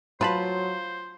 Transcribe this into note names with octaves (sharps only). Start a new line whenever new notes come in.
F#3 F4 B4 C5 A5 B5